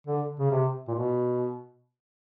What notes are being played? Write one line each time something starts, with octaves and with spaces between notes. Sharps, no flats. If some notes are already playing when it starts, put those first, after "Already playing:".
D3
C#3
C3
A#2
B2